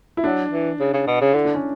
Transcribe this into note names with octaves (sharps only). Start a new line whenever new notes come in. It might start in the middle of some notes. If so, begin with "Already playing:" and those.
E4
F#3 D4
E3
C#3
C#3
B2
C#3
D3 E4
D4
C#4